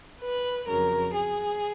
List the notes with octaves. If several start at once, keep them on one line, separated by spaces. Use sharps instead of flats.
B4
F2 C#3 F#3 A#4
G#4